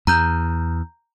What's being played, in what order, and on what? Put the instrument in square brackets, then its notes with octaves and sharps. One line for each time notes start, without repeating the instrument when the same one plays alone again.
[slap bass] E2 [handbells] A#5 G6